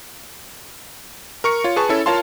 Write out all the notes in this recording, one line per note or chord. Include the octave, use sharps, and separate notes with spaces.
A#4 C#6 C#7
F4 C#5
G#4 B4 A5 C#6
C#4 E4 A4 C#5
F4 A#4 C#5 F5 A5 C6